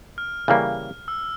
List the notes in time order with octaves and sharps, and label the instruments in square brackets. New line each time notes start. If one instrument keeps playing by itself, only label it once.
[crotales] F6
[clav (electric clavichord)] C#3 E3 G3 A#3 C#4
[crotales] E6